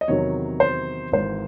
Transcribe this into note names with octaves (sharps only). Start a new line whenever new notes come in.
D#5
E2 C3 D#3 F#3 C#5
C5
G#1 G#2 E3 C5